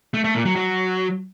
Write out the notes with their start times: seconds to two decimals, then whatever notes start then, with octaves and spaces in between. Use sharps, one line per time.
0.14 A3
0.24 A3
0.35 A#2
0.45 F#3
0.56 F#3